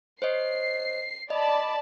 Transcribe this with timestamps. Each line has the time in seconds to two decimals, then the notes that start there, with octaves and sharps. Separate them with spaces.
0.22 C5 C#5 D#5 C7
1.30 D5 D#5 A5 B5